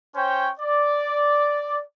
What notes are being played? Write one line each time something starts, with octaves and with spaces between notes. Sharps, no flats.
C#4 C5 C#5 G5
D5